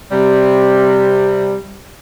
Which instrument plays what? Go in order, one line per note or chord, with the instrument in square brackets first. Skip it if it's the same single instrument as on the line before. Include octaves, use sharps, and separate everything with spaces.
[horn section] C3 G3